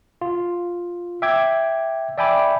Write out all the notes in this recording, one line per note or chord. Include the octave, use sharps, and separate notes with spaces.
F4
E5 G5 D6 G#6
D5 E5 G5 G#5 B5 D6